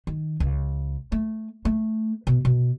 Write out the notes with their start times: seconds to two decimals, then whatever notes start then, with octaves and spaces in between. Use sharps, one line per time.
0.07 D#3
0.40 C#2
1.12 A3
1.65 A3
2.27 B2
2.45 B2